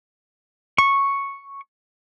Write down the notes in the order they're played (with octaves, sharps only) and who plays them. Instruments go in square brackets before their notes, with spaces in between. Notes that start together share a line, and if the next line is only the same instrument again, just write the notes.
[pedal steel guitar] C#6